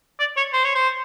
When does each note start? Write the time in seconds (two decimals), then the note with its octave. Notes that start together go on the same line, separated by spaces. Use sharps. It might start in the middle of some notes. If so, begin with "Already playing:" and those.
0.19 D5
0.37 C#5
0.53 C5
0.64 C#5
0.75 C5